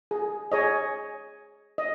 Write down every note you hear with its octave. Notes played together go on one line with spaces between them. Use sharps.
G#4
G#4 C#5 D#5
D#5